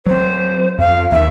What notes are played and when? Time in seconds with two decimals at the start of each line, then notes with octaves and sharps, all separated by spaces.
0.06 F#3 C4 C5
0.79 F2 F5
1.12 D#2 E5